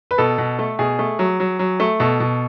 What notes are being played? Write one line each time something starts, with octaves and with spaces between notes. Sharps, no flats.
B4
B2 A4
B2
A3
B2 G#4
A3
F#3
F#3
F#3
A3
B2 A4
B2